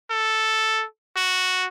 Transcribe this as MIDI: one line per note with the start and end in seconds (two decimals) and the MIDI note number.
0.10 0.85 69
1.16 1.67 66